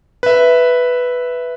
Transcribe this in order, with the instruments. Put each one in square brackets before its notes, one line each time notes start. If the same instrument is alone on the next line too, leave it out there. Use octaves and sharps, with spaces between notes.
[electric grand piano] B4 E5